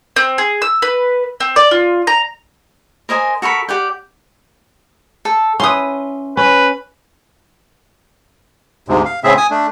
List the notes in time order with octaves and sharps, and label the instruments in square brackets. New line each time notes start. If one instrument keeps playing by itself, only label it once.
[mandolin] C4
G#4
E6
B4
C4
D5
F4
A#5
[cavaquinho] A#4 C5 D#5 G#5
F#4 A4 A#4 B5
G4 D5 F#5 G5
A4
[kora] C#4 E4 B4 [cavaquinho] C6 D#6
[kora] C#4 [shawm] B4
[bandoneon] D2 G#2 C3
F5
A2 C#3 C4 G#4 E5
G#5 D#6
A3 D4